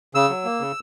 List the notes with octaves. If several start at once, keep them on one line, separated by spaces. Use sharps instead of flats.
C#3 E6
F#3
A#3
C#3